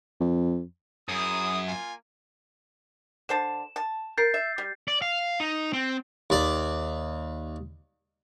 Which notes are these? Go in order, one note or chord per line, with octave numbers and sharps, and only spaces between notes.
F2
F#2 E4 G#4 D#6
A#3 F4 G#5
D3 C5 A5 E7
A5
A#4 G6 A6 C7
E5
G3
D5
F5
D#4
C4
D#2 D5